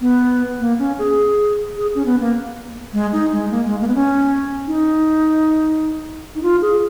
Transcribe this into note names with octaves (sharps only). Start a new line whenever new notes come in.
B3
A#3
C#4
G#4
G#4
C#4
B3
A#3
G#3
D#4
G#3
A#3
G#3
A#3
B3
C#4
D#4
D#4
F4
G#4